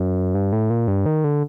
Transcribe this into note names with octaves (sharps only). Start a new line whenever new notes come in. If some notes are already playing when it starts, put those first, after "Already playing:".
Already playing: F#2
G2
A2
A#2
G2
D#3
D3